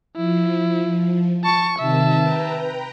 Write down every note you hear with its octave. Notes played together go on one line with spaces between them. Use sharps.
F3 E4
A5 C#6
C3 D#3 E5 A5
B4 G5 A#5